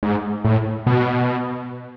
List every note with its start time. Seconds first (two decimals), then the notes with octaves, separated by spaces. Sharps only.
0.03 G#2
0.45 A2
0.87 B2